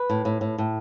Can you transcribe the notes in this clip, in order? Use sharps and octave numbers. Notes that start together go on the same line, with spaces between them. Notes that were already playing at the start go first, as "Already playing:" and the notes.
Already playing: B4
A2
A2
A2
A2